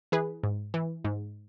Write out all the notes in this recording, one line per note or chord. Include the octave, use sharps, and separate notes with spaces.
E3 G#4 B4
G#2
E3
G#2